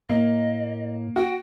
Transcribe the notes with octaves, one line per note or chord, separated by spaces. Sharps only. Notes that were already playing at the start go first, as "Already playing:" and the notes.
A2 A#3 D#5
F#4 G5